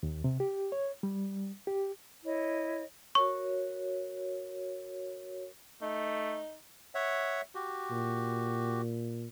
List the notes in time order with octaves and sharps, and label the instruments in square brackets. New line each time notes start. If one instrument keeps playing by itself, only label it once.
[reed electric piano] D#2
C3
G4
C#5
G3
G4
[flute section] E4 C#5 D#5
[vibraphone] F#4 A#4 C#5 [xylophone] C#6
[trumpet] A3 [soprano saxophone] D#4
[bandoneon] C#5 E5 F#5
F#4 G4
[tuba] A#2